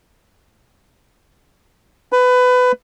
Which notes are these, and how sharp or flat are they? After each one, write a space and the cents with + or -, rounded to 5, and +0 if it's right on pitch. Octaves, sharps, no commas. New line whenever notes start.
B4 +20